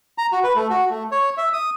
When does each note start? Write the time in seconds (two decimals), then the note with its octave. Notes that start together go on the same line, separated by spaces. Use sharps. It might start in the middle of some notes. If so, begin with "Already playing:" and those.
0.18 A#5
0.32 F#4
0.44 B4
0.55 A3
0.70 F#4
0.90 A3
1.12 C#5
1.37 E5
1.53 D#6